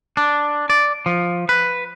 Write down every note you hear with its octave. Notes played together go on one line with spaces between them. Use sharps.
D4
D5
F3
B4